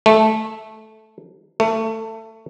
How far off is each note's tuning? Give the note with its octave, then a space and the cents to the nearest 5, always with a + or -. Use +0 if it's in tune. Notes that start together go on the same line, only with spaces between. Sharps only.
A3 -10
A3 +20